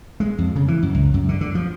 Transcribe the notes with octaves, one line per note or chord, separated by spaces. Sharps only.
G#3
F2
C#3
E3
F#2
C#2
F#2
D3
D3
F3